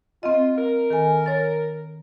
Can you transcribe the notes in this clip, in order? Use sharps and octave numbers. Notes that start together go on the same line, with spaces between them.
C4 F4 D#5
A#4
D#3 A4 G#5
C#5 A6